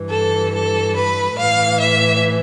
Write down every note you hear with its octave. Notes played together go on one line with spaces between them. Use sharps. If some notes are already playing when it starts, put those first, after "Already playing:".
Already playing: G2 E3
A4
A4
B4
A2 E3 F5
E5